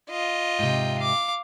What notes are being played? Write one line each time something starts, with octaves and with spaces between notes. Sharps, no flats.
F4 D#5
G#2 C3 G5
F5 D6